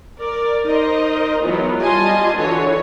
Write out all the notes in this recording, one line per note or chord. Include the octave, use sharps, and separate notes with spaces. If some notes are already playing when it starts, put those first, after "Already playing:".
A#4 D5
D#4 A#4 C5 D#5
E3 F#3 G#3 B3 F4
G3 F4 D#5 G#5 A5 C6
D3 E3 F#4 C#5